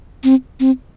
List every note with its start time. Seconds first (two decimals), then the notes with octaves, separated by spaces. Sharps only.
0.24 C4
0.60 C4